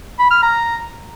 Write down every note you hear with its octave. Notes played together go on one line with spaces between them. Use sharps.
B5
F6
A#5